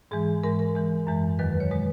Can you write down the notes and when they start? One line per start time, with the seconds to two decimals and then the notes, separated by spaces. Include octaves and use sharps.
0.11 G#2 E3 G#3 G#4
0.44 G#2 E3 G#3 A#4
0.59 A#4
0.76 G#2 E3 G#3
1.07 F#2 E3 G#3
1.39 E2 D#3 F#3 B4
1.60 C#5
1.71 B2 G#3 B4